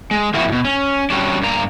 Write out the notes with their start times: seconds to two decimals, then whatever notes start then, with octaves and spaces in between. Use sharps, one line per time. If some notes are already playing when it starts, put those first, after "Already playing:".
0.11 G#3
0.34 F3 A#3 C4 E4 F#4
0.48 G#2 B2
0.65 C#4
1.10 F#3 G3 C#4 D4
1.42 G2 A#3 A#5